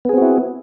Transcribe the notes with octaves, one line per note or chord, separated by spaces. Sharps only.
B3 C4 E4 F#4 G#4